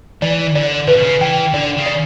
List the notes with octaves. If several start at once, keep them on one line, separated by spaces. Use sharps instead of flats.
E3 D5
D3 D5
C#3 B4
B2
C#3
E3 G5
D3 D5
C#3
D5